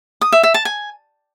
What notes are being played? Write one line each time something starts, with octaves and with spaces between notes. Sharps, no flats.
D#6
E5
E5
A5
G#5